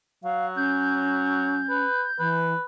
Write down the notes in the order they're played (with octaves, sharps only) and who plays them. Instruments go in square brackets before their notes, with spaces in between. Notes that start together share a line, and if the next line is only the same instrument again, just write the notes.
[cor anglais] F#3 [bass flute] F5
[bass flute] C#4 [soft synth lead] G6
[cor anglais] B4
[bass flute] E3 [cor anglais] B4